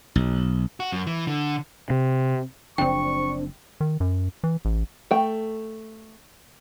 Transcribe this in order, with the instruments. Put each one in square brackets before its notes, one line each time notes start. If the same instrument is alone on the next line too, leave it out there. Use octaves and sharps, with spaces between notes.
[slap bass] B1
[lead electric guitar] F#4
F#2
E3
D3
[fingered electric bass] C3
[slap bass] F#1 C#3 F3 [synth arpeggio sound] C4 D4 [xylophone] G5 [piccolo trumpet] C#6
[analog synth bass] D#3
F#2
E3
A1
[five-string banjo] A3 G5